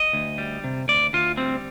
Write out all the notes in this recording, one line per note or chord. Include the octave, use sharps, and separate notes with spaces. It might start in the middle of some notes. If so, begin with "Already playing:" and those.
Already playing: D#5
D2
G3
C3
D2 D5
D2 F4
G3 C4